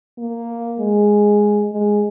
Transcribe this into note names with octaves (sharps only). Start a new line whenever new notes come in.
A#3
G#3
G#3